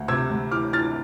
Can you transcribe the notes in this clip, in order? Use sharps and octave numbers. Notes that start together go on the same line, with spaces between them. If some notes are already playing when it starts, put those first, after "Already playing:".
Already playing: D2
C3 E6 G#6
D2
E3 D6 F6
E3 F6 A6